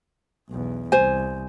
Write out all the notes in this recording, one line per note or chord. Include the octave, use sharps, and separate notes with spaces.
B1 E2
C2 C5 G#5